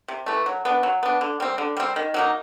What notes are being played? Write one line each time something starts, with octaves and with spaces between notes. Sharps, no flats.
C3
E3 A3
F#3
B3 D4
F#3
B3 D4
D3
G3 C4
D3
G3 C4
D#3
F#3 A#3 D#4